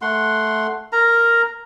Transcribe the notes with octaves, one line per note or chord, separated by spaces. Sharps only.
A3 F#5 C6
A#4 A#5